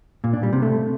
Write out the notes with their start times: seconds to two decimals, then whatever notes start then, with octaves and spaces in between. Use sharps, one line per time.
0.24 A#2
0.33 D4
0.43 G3
0.53 C3
0.62 A3